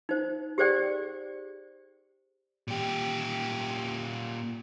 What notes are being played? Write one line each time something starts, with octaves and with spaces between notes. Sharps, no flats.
D#4 C5
G4 G#4 C5 D5 G5
A#2 G4